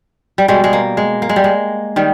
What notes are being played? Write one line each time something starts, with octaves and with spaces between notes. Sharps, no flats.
G3
B2 G3 G#3
G#3
A#3
G#3
A#3
G#3
G3
G#3
D#3 G3